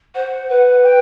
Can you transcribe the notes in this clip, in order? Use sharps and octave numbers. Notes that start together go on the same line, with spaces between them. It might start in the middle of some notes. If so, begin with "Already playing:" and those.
C5 F#5
B4
G5